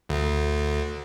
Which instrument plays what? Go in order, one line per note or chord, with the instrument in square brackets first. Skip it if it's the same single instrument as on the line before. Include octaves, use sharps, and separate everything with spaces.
[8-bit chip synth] D2